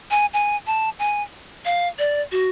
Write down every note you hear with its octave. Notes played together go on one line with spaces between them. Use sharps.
G#5
G#5
A5
G#5
F5
D5
F#4